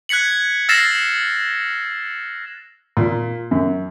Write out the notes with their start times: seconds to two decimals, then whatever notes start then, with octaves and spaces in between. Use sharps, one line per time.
0.09 F#6 G#6 B6 C#7 F#7
0.69 E6 F6 A6 A#6 C7 E7
2.97 A#2
3.51 F#2